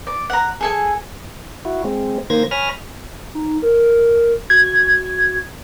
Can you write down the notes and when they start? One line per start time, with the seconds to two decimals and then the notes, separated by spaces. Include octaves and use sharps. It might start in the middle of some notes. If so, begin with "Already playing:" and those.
0.07 D5
0.30 F#5 A#5
0.61 G#4 A4 G#5
1.65 E4 F#4
1.84 G#3 C4
2.30 D#3 A#3 C5 G#6 A#6
2.51 C#5 G#5 B5 F6 A#6
3.35 D#4
3.62 A#4
4.50 F#4 G#6